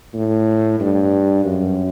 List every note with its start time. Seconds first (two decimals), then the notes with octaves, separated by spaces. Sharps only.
0.14 A2
0.80 G2
1.45 F#2